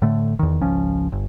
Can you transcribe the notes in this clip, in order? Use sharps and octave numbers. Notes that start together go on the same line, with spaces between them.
A2 D3 A3
E2 D#3
G#1 C#2 F3 C#4
G1